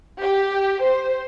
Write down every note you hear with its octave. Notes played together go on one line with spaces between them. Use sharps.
G4
C5